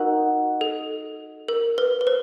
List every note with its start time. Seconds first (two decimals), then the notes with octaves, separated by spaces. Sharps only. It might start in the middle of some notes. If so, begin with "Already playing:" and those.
Already playing: D#4 F#4 A#4
0.61 A4
1.48 A#4
1.78 B4
2.01 B4
2.07 C5